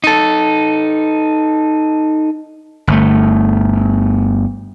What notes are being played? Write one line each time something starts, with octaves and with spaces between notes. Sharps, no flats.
D#4 A4
G1 A3